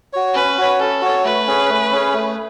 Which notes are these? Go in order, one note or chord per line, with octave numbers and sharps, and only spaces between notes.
F#4 C#5
C#4 B4
F#4 C#5
C#4 A4
F#4 C#5
A3 B4
C#4 G#4 C#5
A3
C#4 G#4 C#5
A3